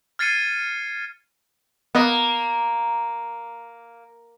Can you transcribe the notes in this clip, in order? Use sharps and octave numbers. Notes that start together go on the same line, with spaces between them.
F6 G#6 A6 C7 C#7 D#7
A#3 B3 D#5